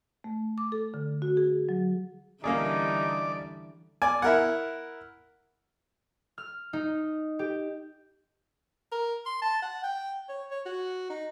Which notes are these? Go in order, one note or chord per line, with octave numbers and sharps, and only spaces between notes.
A3
D6
A4
D3
F#4
G#4
F#3
D3 E3 G3 A#3 C#4 D#4 G#4 D5
D5 G#5
E4 A#4 F#5
F6
D#4
G4
A#4
C6
A5
F#5
G5
C#5
C#5
F#4
D#4